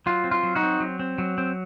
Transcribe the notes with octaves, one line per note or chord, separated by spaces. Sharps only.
F#3 F4
C4
F4
F#3
D#4 F#4
C4
F#3
C4
F#3
C4